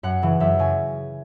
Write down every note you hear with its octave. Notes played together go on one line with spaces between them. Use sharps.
F#2 F#5
C#3 E3
F#2 E5
C#3 G#5